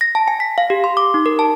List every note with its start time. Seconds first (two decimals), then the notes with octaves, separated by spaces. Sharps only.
0.01 A#6
0.15 A5
0.28 G#5
0.40 B6
0.58 F5
0.70 G4
0.84 C6
0.97 D6
1.14 D#4
1.26 A#4
1.39 A5